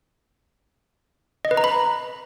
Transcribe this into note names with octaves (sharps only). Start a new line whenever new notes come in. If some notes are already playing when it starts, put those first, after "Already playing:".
D#5
B4
A#5
B5